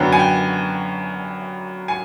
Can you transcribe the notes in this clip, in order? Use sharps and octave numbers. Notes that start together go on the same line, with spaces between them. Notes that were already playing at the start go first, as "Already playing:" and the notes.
Already playing: F#2 D3 F#3 B3 G5
G#5
G5
G#5